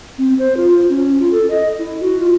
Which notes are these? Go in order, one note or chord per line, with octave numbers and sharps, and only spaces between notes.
C4
C5
F4
F4
C#4
F4
A4
D#5
E4
F#4
F4